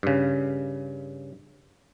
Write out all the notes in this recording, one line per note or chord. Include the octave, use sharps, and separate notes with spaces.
G2 C#3